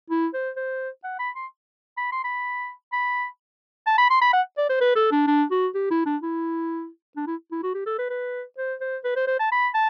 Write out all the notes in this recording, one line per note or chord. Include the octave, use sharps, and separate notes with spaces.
E4
C5
C5
F#5
B5
C6
B5
C6
B5
B5
A5
B5
C6
B5
F#5
D5
C5
B4
A4
D4
D4
F#4
G4
E4
D4
E4
D4
E4
E4
F#4
G4
A4
B4
B4
C5
C5
B4
C5
C5
A5
B5
A5